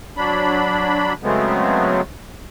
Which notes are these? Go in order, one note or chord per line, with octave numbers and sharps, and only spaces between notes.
F#3 D4 B5
C#3 F#3 G#3 A3 B3 C4